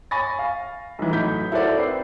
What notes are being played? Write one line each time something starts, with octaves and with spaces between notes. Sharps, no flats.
G#5 B5 C#6 A6 A#6
F5
B1 E3
A2 F#3 D#4 G6 B6
E4 F#4 A4 A#4 C5 D5
C4 B4 C7